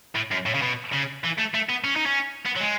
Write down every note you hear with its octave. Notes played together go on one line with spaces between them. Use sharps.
A2
F#2
A2
C#3
B2
C#3
E3
A3
A3
B3
C#4
D#4
C#4
B3
F#3
G#3